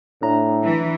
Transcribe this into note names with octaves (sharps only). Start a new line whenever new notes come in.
A2 D4 A#5
E3